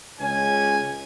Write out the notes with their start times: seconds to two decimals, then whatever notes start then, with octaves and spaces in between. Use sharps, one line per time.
0.20 C#2 C#4 G#5